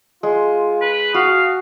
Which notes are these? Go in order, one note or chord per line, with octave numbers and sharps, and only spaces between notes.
G#3 F4
B4
F#4 F5 D#6